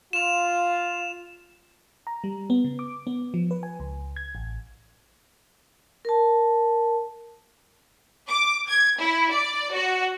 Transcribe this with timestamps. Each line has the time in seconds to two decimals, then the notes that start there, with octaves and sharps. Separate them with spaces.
0.13 F4 E7 F7
2.07 A#5
2.24 G3
2.50 B3
2.64 C#3
2.79 D6
3.07 B3
3.34 F3
3.51 B4
3.63 G#5
3.80 C#2
4.16 G#6
4.35 A1
6.05 A#4 A5
8.28 D6
8.69 G#6
8.99 E4
9.32 D5
9.73 F#4